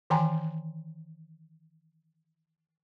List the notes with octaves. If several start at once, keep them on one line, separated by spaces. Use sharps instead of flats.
D#3 E3 G5 G#5 A#5 C6